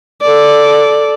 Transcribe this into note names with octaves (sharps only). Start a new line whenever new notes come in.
A4 D5